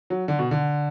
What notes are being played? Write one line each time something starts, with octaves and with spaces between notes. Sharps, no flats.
F#3
D3
B2
D3